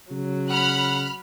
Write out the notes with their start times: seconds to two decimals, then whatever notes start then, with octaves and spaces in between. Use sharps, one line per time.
0.11 C#3 F#3
0.50 F#5 B5 F6 F#6